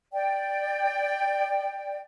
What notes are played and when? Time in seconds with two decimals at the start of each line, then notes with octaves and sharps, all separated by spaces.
0.13 D5 G5